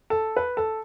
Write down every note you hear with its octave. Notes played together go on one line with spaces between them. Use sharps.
A4
B4
A4